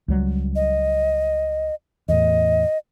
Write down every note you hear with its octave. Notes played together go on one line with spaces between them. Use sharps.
C#2 F#3 G3
D#5
E2 A2 D#5